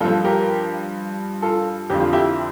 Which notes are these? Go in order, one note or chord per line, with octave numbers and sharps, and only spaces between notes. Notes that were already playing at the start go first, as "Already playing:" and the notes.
G2 F3 F4 A4
G4 A#4
F4 A4
F2 D3 F3 G4
F4
E4 G4